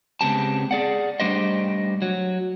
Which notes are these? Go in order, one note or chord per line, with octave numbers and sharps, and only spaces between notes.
C#3 G#3 B3 C4 G4 A5
G#4 D5 F#5
G3 A3 D4 G4 C5 D#5
F#3